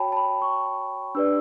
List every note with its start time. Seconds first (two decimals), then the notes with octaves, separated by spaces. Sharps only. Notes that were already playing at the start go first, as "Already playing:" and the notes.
Already playing: F#4 C#5 G5 A5 B5
0.12 A5
0.16 B5
0.42 C#6
1.15 D4 G4 B4 D5 E6